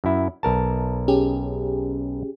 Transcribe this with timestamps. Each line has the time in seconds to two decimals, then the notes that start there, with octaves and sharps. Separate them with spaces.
0.04 F#2 E4
0.43 B1 A#4 A5
1.08 C#4 G4 G#4